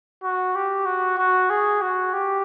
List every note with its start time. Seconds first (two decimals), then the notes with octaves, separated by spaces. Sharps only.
0.23 F#4
0.55 G4
0.85 F#4
1.18 F#4
1.50 G#4
1.81 F#4
2.13 G4